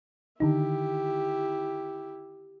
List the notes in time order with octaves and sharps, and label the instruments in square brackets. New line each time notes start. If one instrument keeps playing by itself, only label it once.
[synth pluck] D3 D#3 D#4 [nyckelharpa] E4 G4